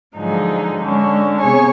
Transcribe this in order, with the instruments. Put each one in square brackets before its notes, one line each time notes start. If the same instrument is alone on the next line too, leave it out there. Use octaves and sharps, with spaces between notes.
[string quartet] G#2 D3 F3 F#3 D#4 G#4
D3 G#3 C#4 D4
C3 B3 G#4 C#5 G#5 C#6